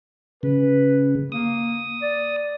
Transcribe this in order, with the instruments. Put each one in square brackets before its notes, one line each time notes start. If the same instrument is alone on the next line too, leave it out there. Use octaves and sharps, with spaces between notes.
[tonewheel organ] C#3 [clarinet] B4
[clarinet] A#3 [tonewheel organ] D#6
[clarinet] D5